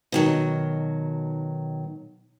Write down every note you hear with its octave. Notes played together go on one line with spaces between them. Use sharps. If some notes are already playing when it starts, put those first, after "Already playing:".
B2 D#3 F#3